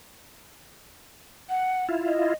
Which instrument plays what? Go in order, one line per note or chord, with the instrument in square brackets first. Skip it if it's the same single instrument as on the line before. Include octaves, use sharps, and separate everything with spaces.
[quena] F#5
[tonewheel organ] E4 F4
[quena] D#5